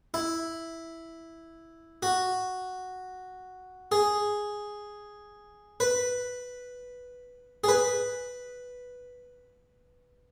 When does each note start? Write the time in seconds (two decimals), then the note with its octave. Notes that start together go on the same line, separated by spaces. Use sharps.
0.14 E4
2.03 F#4
3.92 G#4
5.80 B4
7.64 G#4
7.68 B4